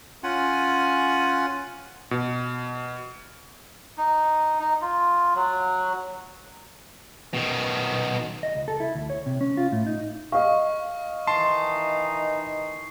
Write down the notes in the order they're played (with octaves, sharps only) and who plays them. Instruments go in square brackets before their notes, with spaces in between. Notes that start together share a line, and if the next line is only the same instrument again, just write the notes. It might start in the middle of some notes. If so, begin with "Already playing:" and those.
[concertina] C#4 F4 F#5 G#5
[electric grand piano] B2
[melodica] D#4
D#4
F4
F#3
[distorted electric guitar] B2 D#3
[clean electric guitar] D#5
C#2
A4
E4
D2
C#5
C3
C#4
F4
A2
D#4
[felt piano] D#5 F5 [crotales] C#6
[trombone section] D#3 E3 D#4 [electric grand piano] A5 C6 [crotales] C7